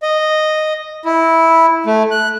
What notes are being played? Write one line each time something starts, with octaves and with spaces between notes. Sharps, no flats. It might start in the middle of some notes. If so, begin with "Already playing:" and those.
D#5
E4
A3
F#6